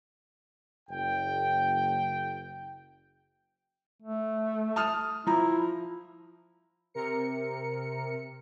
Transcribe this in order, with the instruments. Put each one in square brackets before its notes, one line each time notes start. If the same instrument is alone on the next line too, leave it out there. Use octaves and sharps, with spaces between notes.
[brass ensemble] F#1 G5
[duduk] A3
[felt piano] A5 D#6 F6
[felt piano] F3 A#5 [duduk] E4
[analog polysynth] C3 A#4 C#7